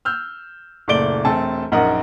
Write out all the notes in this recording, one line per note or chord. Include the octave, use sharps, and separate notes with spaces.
E6 F6 G6
F#1 A#2 A3 D5 D7 G7
E1 A3 C4 A4 G#5 A5
A#1 F#2 D#4 A#4 F#5